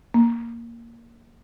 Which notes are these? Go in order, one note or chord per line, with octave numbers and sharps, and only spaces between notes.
A#3